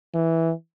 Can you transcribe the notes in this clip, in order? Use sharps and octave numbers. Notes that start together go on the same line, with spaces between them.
E3